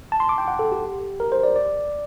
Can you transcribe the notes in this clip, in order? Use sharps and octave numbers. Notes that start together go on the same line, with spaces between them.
A5
C6
D6
G5
F#5
A4
G4
A#4
C5
D5
D5